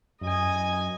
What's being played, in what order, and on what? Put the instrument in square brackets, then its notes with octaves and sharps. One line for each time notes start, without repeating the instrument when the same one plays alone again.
[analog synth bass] F#2 [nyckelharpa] D#5 G#5